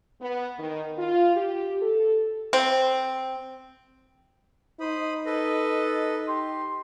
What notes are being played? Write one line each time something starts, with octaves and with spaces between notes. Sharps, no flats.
B3
D#3
F4
G4
A4
C4
D#4 C5 B5 D#6
A4 B4 D#5
G4 C6